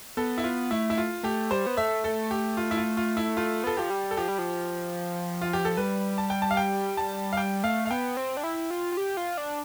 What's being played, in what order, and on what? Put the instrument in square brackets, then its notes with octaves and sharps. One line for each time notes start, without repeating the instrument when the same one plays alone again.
[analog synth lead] B3 [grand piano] A4
[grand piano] E4
[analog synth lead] B3 [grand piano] F4
[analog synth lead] A3 [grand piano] E4
[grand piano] E4
F4
[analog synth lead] A3 [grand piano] G4
[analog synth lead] G3 [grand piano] C5
[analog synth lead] B3
[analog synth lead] A3 [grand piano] E5
[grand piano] A4
G4
F4
E4
F4
F4
E4
[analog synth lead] A3 [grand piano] F4
[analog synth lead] B3 [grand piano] A4
[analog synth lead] F3 [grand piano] G4
[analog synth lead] G3
[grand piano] A4
[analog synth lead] F3 [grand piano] G4
[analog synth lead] G3
F3
[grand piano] F4
G4
A4
[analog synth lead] G3 [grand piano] B4
[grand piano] A5
G5
A5
F5
G5
A5
F5
[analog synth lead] G3 [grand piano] G5
[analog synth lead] A3 [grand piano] F5
[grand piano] F5
[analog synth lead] B3 [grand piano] G5
[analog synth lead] C4
D4
E4
F4
F4
G4
F4
D4